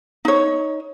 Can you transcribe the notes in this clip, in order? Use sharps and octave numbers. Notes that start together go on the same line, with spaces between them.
D#4 C#5